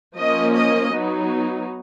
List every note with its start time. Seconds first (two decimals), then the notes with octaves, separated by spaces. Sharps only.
0.16 F3 A#3 C#4 D#5
0.54 D#5
0.91 F#3 B3 D#4